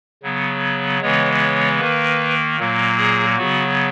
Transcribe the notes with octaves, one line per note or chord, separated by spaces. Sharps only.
C#3 F#3 B3
C#3 E3 G#3 B3 C#5
C#5
D#3 A#3 B4
A#2 F#3 A#3
G#4
C#3 F#3 B3 F#4